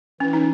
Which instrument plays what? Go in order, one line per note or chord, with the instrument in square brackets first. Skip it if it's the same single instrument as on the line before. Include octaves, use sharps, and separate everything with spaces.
[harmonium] E3 [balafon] C#4
[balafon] D#4